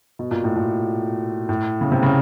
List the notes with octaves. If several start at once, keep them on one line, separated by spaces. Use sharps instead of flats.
B2
A#2
A2
A#2
A2
C#3
C3
C#3